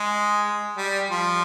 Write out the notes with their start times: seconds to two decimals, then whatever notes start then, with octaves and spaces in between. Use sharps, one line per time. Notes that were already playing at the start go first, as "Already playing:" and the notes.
Already playing: G#3
0.77 G3
1.10 F3